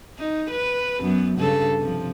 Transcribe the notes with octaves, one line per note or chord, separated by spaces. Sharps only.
D#4
B4
F#2 B3
G2 C#3 A4
C3 F3